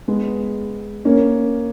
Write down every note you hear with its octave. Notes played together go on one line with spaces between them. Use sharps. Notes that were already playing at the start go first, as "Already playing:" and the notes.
G#3 B3
A#3 C#4